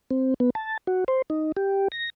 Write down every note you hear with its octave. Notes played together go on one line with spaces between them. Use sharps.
C4
B3
A5
F#4
C5
D#4
G4
A#6